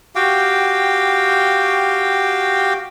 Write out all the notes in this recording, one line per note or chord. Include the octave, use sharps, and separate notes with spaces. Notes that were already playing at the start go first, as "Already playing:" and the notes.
F#4 G4 F5 G5